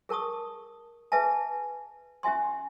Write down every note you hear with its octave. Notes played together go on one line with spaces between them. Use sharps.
G#4 A#4 A5 C#6 D#6
G#4 B4 E5 G#5 A5
C#4 G4 E5 G#5 C6